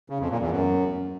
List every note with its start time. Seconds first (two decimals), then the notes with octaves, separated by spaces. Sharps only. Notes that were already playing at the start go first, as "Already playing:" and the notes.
0.10 C#3
0.20 F2
0.30 A#2
0.41 E2
0.51 F#2